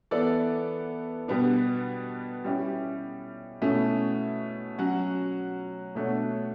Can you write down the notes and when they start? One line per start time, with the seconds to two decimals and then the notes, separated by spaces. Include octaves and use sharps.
0.11 E3 B3 E4 A4 D5
1.28 B2 G3 B3 D4
2.44 G3 C#4 E4 G4
3.62 B2 A3 C#4 E4
4.78 F#3 C#4 F#4
5.95 B2 A3 D4 F#4 C#5